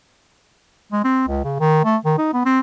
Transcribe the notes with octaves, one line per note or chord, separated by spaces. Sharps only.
G#3
C4
C#2
C#3
D#3
A3
D#3
D#4
B3
C4